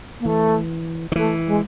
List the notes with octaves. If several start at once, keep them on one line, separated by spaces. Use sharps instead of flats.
A#3
E3 A3
D#3
E3 A3
G#3